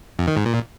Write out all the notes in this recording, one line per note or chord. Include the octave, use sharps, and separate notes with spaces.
F2
D#3
G#2
A#2